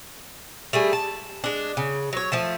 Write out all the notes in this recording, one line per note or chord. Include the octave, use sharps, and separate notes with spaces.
G3 A3 G#4
A5
G#3 D4
C#3
F#3 C#5
F3 A3 A5